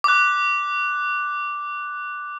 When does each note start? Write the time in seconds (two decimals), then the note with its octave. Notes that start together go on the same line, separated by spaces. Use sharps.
0.04 D6 F#6